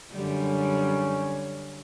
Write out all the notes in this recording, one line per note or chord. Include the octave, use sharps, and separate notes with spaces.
F#2 D3 G3 C#4